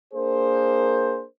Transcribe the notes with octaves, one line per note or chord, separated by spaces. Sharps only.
A#3 D4 G#4 A#4 C5